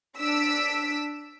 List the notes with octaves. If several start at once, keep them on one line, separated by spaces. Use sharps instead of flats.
D4 E6 B6 D7